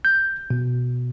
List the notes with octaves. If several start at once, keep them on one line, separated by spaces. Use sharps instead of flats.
G6
B2